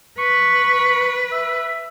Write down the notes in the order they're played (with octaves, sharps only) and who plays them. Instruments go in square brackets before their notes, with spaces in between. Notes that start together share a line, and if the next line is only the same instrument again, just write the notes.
[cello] B4 [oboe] C#6
[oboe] E5